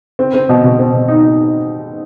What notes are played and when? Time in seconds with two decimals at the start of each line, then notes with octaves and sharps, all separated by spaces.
0.19 C4
0.34 C4
0.49 B2
0.64 B2
0.79 C4
0.93 B2
1.08 D#4
1.23 D#4